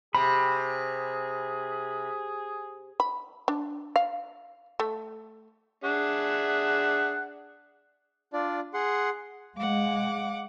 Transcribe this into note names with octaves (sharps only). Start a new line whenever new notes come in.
C3 G#4 B5
B5
D4
F5
A3
D4 G#4 E5 F#5
D4 F4 D5
G#4 F#5 C6
G#3 F5 F#5 D6